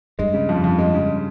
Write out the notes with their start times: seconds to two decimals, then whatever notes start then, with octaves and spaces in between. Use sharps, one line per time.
0.19 G2 G#3
0.34 C#3
0.49 F2
0.64 F2
0.79 G#3
0.94 C#3